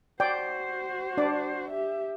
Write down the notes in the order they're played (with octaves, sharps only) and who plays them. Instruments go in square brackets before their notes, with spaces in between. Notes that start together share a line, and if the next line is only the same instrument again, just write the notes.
[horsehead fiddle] F#4 C5 [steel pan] D5 G5
[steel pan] D4 D5
[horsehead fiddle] G4 E5